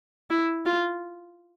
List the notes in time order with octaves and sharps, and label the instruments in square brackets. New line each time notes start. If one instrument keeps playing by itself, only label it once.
[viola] E4
F4